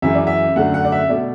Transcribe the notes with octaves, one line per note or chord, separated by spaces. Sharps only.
F#2 E3 G#3 E5
D5
E5
F#2 D3 A3 F#5
F#5
D5
E5
B2 A3 D5